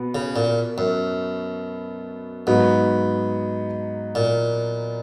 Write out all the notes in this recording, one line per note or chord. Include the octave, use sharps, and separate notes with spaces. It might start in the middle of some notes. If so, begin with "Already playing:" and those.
Already playing: B2 B3
C#3
A#2
F#2
G#2 F#3 B3 D#4
A#2